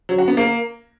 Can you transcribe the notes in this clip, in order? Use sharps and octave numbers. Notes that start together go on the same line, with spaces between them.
F#3
F#4
B3
A#3